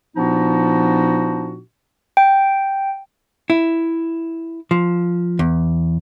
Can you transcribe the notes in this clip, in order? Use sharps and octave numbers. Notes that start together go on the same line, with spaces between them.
A#2 F3 B3 D4 D#4 F#4
G5
E4
F3
E2